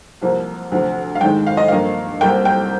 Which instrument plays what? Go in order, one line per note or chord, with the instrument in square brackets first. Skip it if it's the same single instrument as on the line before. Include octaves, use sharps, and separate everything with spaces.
[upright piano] C2 C3 F3 A#3
D2 C3 F3
F5
G#2 D#3 G#3 G5
F5
D#5
G2 F3 A#3 F5
C2 C3 G3 A#3 G5
G5